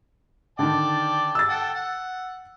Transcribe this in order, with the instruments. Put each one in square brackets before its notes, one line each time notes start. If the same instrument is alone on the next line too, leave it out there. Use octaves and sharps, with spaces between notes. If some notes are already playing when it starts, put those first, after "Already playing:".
[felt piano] D3 D#3 [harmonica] D5 G5 A5
[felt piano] E6 A6
[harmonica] A4 F#5 G5
F#5